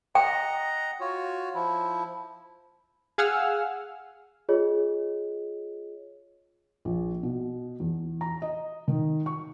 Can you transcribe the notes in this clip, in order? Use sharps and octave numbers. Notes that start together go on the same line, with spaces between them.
D#5 F#5 G5 A#5
F4 F#4 C#5
F3 E4
G#4 F5 F#5 G#5 E6 F6
F4 G#4 C#5 D#5
A#1
B2
E2
A#5
D#5
D#3
C#6